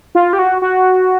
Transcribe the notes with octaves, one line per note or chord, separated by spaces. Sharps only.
F4
G4
F#4
F#4